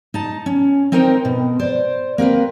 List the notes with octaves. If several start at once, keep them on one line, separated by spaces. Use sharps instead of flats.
D#4 A5
C#4
C4 D#4 A#4 C5 F#5 G5
B2
C5 D5
A#3 C4 A#4 B4